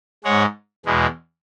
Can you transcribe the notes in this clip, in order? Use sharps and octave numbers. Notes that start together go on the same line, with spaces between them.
G#2 G#3 C#5 F#5
E2 B2 G#3